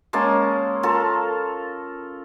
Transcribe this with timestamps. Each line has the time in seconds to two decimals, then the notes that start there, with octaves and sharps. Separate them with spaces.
0.13 G#3 A#3 C#4 A5
0.83 F4 A4 A#4 A5